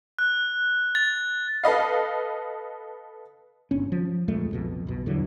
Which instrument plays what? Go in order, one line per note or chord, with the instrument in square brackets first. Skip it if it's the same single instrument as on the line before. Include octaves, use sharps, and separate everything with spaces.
[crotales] F#6
A6
[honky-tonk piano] A4 B4 D#5 F5
[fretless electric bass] G1 C#4
F3
D#1 F2 G#3 A3
B1 F2 B2
B1 B2
E2 D3 E3 F#3